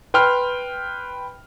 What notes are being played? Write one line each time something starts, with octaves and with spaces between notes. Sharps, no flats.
B4 G5 C6 F6